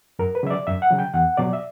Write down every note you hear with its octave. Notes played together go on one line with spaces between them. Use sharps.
F#2 A#4
B4
C#3 F#3 E5
D5
F#2 E5
F#5
C#3 F#3
G5
E2 F#5
B2 F#3 D5
E5